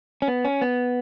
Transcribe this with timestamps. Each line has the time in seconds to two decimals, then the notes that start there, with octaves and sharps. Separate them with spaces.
0.22 C#4
0.28 B3
0.45 C#4
0.61 B3